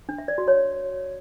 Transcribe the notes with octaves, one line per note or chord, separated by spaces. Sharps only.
D4
E5
D5
F#4
C#5